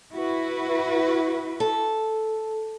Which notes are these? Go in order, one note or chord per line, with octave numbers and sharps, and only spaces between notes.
E4 F#4 B4
A4